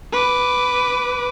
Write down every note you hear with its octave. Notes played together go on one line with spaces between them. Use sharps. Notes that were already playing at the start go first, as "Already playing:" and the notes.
B4 D6